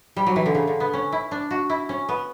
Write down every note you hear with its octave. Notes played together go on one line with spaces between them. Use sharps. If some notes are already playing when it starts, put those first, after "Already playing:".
G3
F#3
E3
D3
C#3
D3
B3
C#4
E4
D4
F#4
E4
C#4
B3